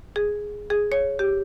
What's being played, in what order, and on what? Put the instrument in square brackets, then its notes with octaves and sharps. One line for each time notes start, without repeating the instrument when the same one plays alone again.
[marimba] G#4
G#4
C#5
G4